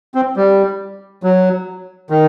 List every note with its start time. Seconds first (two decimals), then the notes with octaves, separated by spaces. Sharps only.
0.15 C4
0.36 G3
1.23 F#3
2.10 D#3